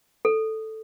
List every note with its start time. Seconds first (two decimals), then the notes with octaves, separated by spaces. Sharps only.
0.25 A4